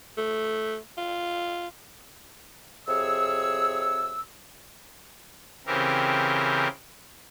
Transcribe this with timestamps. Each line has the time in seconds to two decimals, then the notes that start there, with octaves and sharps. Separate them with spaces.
0.18 A3
0.98 F4
2.88 F2 C3 G#4 C#5 E6
5.66 C#3 E3 C4 G4 A#4